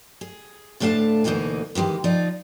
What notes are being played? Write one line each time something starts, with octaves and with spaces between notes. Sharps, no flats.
G#4
D2 A2 A3 D4 F5 A5
D2 B2 E3 A#3 D#4 G#5
D#3 E3 G#3 G4
F3 D#4 F4 D5